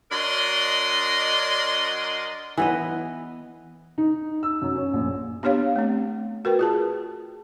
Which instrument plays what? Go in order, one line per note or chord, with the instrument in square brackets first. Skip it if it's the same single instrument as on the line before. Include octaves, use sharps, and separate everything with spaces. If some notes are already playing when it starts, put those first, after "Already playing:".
[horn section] F#3 D4 A#4 D#5 C6
[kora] E3 B3 D#5
[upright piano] D#4
E6
F#2
C#4
A#1
[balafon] B3 D4 G4 C#5 F5
A3 C4
F#4 A#4 B4 G5
F4 G#4 A5